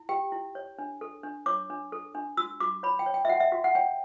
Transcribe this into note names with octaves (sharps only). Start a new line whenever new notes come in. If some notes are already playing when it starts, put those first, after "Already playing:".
Already playing: E4
G4 G5
E4
C#5
D4
A4
D4
C#5 D6
D4
A4
D4
F#4 E6
F#4 D6
C#5 B5
G5
C#5
G5
E5
F#4 F#5
E5
F#4
F#5
C#5 G5